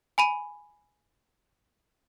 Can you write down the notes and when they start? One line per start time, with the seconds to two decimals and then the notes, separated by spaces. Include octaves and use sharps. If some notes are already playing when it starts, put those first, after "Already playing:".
0.18 G#5 B5 D#7